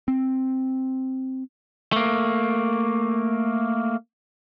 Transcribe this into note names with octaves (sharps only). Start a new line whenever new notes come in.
C4
A3 A#3